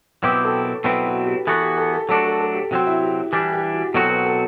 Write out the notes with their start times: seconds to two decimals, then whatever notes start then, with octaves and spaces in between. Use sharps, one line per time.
0.23 B2 F#3 C4 E4 G4 B4
0.44 A4
0.64 A4
0.84 B2 F#3 C4 E4 B4
1.06 F#4
1.26 G4
1.47 E3 B3 F#4 A4
1.62 G4
1.78 A4
1.93 A4
2.09 F#3 A3 D4 F#4 A4
2.25 A4
2.40 A4
2.55 G4
2.71 C3 F#3 C4 F#4
2.87 E4
3.02 G4
3.33 E3 G3 D4 G4
3.53 G4
3.73 F#4
3.94 B2 F#3 C4 F#4 A4
4.10 B4
4.25 A4